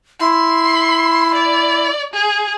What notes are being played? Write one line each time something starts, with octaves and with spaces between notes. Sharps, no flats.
E4 C6
D5
G#4